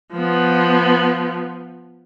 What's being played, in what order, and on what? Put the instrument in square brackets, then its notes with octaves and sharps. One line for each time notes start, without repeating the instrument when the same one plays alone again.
[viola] F3 B3